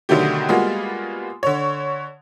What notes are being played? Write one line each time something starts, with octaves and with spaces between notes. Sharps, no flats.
B2 D3 D#3 F#3 A3 G4
G3 G#3 A#3 B3 F4 F#4
D3 C#5